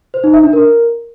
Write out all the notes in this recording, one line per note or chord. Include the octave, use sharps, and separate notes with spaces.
C5
D#4
E5
D4
A#4